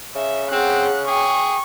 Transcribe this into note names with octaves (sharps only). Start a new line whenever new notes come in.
C#3 E5
C4 G#4 F#5 F#6
G#4 G5 C#6 D6